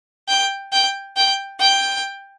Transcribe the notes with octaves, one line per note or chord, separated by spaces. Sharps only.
G5
G5
G5
G5